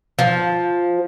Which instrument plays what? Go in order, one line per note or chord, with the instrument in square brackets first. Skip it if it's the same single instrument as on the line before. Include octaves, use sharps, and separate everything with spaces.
[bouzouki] F3